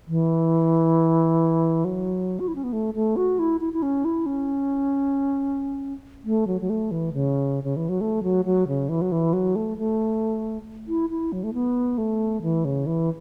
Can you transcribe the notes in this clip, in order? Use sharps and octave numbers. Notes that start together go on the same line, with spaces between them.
E3
F#3
F#4
E4
C#4
B3
A3
A3
F#4
E4
E4
E4
C#4
E4
C#4
A3
F#3
F#3
A3
E3
C#3
C#3
E3
F#3
A3
F#3
F#3
C#3
E3
F#3
E3
F#3
A3
A3
E4
E4
F#3
A3
B3
A3
E3
C#3
E3